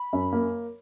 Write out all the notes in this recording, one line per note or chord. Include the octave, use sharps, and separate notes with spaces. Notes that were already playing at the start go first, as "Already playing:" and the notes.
Already playing: B5
F#2
A#3